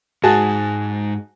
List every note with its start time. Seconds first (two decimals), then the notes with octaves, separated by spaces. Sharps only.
0.23 G#2 F#4 G#4 A5